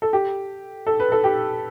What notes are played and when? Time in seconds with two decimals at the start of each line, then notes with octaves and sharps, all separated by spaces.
0.02 A4
0.13 G4
0.87 A4
1.00 B4
1.12 A4
1.24 G4